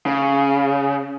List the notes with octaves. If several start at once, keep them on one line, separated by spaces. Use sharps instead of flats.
C#3